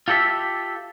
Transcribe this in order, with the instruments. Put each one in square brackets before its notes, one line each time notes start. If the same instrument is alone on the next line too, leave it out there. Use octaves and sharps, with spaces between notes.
[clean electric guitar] F4 G4 A4 D5 E5